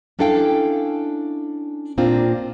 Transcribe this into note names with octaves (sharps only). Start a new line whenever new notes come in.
C#4 D4 E4 A4 F5 G5
A#2 A#3 C4 D4 F4